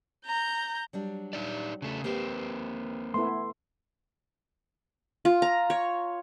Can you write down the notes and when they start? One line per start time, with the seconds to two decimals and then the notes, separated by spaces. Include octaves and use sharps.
0.24 A#5 G6
0.93 F#3 G3 D4
1.33 D#4 G4 D5
1.82 C#3 A3
2.04 D#2 A#3 C4 G4 B4
3.14 A3 B3 E4 C6
5.25 F4
5.42 A#5
5.70 C#5